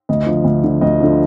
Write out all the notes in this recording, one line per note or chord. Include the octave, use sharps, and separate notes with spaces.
D2 D#5
D3 F3
D2
D3 F3
D2 D#5
D3 F3